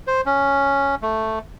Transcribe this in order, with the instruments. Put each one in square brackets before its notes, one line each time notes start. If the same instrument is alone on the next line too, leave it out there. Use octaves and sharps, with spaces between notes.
[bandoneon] C5
C#4
A3